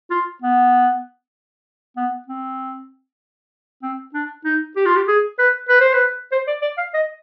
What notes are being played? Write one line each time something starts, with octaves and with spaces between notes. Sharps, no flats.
F4
B3
B3
C4
C4
D4
D#4
G4
F4
G4
G#4
B4
B4
C5
B4
C5
D5
D5
F5
D#5